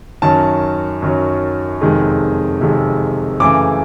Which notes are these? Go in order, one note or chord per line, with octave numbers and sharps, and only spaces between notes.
F#2 D#3 F#3 A5
F#2 D#3 F#3
F2 C3 D#3 G#3
F2 C3 D#3 G#3
F#2 C#3 E3 A3 D6